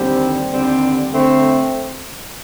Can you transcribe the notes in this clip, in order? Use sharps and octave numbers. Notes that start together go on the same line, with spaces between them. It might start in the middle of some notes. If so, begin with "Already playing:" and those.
Already playing: D#2 D3 G3 C4
D#2 D3 G3 C4
D3 A3 C4